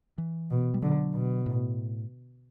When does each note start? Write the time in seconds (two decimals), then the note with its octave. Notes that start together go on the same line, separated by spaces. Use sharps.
0.18 E3
0.51 B2
0.74 G3
0.82 D3 F#3
1.14 B2
1.46 A2